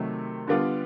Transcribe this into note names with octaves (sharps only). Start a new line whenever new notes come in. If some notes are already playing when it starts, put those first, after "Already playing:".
Already playing: C3 D#3 F#3 A3
D3 G3 B3 D4 F4